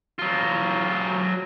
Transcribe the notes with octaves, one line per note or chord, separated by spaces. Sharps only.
F#3 F4